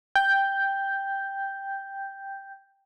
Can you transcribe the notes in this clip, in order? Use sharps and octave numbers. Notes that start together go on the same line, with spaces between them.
G5 G6